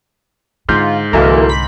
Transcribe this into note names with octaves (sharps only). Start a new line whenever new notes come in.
G#2 D3 F4 G6
C2 D3 E3 F#3 G#3 A#3 E4 A4
B5 B6